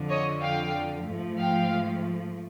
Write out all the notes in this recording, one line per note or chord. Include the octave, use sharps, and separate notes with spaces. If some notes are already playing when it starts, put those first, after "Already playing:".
Already playing: F2 D3 F3
C#5 D#5
F5 G5
G#2 F3 A3
F5 G5